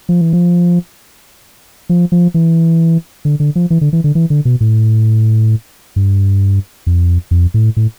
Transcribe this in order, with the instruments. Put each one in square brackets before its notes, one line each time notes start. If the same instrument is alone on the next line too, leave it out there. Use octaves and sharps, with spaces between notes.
[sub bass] F3
E3
F3
F3
F3
E3
D3
D3
F3
E3
D3
E3
D3
E3
D3
B2
A2
G2
F2
F2
A2
A2